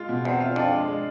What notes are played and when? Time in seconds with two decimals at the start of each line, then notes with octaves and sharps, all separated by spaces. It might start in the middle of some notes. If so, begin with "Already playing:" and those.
Already playing: G#3 F4
0.09 B2
0.25 E2 C4
0.40 F4
0.56 F2 D4
0.71 G#3
0.88 G#3